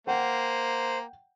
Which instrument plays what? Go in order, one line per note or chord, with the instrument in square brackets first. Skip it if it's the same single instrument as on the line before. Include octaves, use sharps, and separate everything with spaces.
[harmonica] A#3 [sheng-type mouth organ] C5 [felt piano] F#5 G5